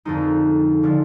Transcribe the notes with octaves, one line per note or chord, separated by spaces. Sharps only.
F2 D3 F3 G#3 D#4
D3 F3 G#3